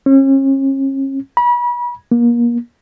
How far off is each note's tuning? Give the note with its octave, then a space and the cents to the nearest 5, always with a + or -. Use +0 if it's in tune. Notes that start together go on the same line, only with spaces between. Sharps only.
C#4 -40
B5 -35
A#3 +30